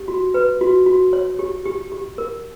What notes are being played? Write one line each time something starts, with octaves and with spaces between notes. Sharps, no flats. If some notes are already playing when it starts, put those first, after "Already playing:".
Already playing: G4
F#4
B4
F#4
F#4
C#5
G4
G4
G4
A#4